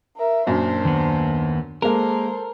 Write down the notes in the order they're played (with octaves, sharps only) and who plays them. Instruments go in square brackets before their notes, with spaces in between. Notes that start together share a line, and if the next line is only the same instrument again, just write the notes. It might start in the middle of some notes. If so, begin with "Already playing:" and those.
[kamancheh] A#4 E5
[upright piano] F#2 A#2 [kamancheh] D4 C5
[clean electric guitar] D#2 B3
[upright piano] G#3 A#3 [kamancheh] A4 C5 [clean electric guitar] A#4